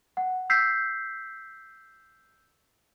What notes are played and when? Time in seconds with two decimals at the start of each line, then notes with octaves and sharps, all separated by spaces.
0.17 F#5
0.50 E6 G6 B6 C7